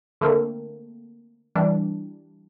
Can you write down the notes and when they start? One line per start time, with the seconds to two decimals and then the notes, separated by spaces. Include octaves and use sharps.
0.21 D3 A3 A#3 C4
1.55 E3 G3 D4